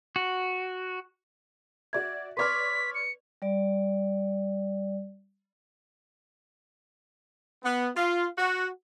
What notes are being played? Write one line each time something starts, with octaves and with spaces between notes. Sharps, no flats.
F#4
F#4 D5 E5 G#6
B4 C#5 D5 C6 D6 F6 B6
C#7
G3 D5
B3
F4
F#4